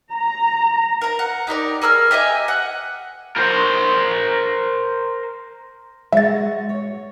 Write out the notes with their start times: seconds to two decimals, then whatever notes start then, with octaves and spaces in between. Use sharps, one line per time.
0.11 A#5
1.01 A#4 A#5
1.19 F#5
1.47 D#4 G4 A#4 D5
1.82 G#4 A#4 E6 F6
2.11 G4 D#5 E5 G#5
2.48 F#5
3.37 A#4 C5
6.13 G#3 F#4 E5 A6
6.69 C#5